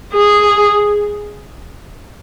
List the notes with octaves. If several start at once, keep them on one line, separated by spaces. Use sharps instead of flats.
G#4